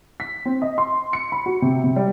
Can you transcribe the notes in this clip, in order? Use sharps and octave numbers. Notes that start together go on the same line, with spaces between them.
B6
C4
D#5
C6
C#7
B5
F#4
C3
C3
G3